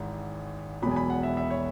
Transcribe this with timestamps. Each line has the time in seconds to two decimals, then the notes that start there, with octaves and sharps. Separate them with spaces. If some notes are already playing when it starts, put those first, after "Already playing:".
Already playing: G#1 G#2 E3
0.82 E1 E2 B2 F#3 B5
0.91 G#5
0.96 B5
1.10 F#5
1.23 E5
1.37 E5
1.50 C#5